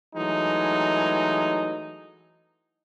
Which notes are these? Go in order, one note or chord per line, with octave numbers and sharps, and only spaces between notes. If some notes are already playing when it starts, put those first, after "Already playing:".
E3 F#3 G#3 A3 D#4